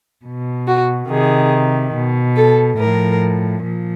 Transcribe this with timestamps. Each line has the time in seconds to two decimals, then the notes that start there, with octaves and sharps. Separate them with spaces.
0.25 B2
0.67 F#4
1.09 C3 D#3 G#4
1.94 B2
2.36 A4
2.78 A2 F3 A#4
3.62 A#2 F3